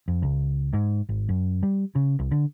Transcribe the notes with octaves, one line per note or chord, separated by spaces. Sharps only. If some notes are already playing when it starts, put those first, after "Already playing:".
F2
C#2
G#2
G#1
F#2
G3
C#3
C2
D3